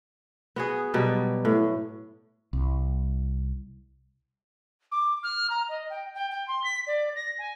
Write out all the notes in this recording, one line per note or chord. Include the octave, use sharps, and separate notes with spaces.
B3 F#4 G#4
B2 F#3 G3
A2
C2
D6
F6
A#5
D#5
G5
G5
G5
C6
B6
D5
A#6
G#5